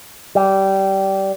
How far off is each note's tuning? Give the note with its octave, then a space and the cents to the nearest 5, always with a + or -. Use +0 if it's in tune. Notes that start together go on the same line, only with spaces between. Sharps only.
G3 -20